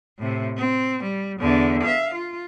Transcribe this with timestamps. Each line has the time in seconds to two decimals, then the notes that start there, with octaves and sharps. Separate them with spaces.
0.19 A2 C3
0.57 C4
1.03 G3
1.39 E2 D3
1.83 E5 F5
2.14 F4